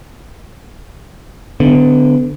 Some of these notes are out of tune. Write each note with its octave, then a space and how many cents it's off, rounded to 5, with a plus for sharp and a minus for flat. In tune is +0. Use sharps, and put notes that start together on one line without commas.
D3 +0 B3 +35